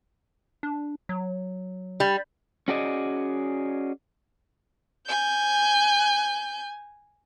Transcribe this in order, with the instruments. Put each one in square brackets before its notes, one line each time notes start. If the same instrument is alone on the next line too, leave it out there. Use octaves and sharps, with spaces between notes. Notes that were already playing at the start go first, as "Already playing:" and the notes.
[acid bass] D4
F#3
[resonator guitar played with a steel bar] G3
[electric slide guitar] C#4 F#4 G#4 D5 D#5
[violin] G#5 G6